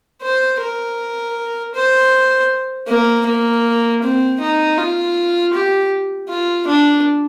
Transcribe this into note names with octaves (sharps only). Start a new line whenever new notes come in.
C5
A#4
C5
A#3
A#3
C4
D#4
F4
G4
F4
D4